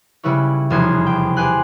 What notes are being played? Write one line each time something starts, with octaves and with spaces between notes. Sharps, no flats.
C#3 G3 E4 B4 C#5
F1 E2 C3 F#4 C6 G#6
G5
G4 B4 G#5 C6 F#6